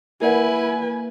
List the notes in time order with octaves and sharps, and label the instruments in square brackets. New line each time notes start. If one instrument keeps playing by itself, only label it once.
[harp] A#3 [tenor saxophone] E4 [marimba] A#4 D5 F#5 [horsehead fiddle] B4 G#5